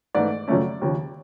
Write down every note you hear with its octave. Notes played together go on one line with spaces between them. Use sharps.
G#2 E3 A3 D5
F#2 C#3 F3 A3 C#4
D#2 C#3 F3